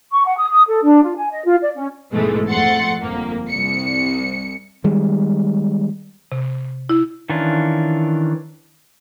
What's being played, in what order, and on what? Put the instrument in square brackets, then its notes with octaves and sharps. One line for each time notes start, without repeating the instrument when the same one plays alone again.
[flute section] C#6
F#5
D#6
D#6
A4
D4
F4
G#5
D#5
F4
D5
C#4
[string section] A#1 G#2 B2 E3 G#3 A3
F2 A3 F#5 C6 A6 C#7
G1 F2 A#3
C2 C#7
[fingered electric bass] D#3 G3 G#3
[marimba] C3
E4
[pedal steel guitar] D#3 E3 C#4 D4 F4